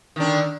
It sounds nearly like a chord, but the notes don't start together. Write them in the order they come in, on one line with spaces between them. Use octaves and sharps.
D#3 D4 D3